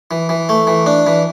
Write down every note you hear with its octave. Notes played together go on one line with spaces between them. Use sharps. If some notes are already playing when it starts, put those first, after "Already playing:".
E3
E3
A3
E3
D4
E3